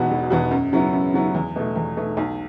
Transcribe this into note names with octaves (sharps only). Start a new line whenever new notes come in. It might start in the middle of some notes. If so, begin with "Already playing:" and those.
Already playing: E1 E2 B2 B3 F#4
E1
E2 B2 B3 F#4
F#2
C#3 F#3 B3 E4
F#2
C#3 F#3 B3 E4
E2
B2 A3
E2
B2 A3
B1